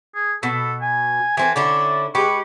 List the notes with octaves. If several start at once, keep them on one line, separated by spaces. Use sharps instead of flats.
G#4
B2 A4
G#5
E3 C4 A4 G#5
D3 C#4 E4 D5
G#3 G4 B4 C#6